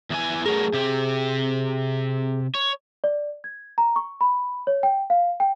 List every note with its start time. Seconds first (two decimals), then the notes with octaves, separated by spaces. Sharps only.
0.10 E2 E3 G#5
0.46 F#3 A3 G#4 A#4
0.73 C3 G4
2.55 C#5
3.04 D5
3.44 G#6
3.78 A#5
3.96 C#6
4.21 B5
4.67 C#5
4.83 G5
5.10 F5
5.40 G5